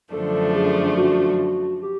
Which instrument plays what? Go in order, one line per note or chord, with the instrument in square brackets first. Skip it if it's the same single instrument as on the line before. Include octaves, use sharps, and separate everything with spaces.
[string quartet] F#2 D3 F3 A3 D4 [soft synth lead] A4
[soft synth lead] G#4
F#4
G4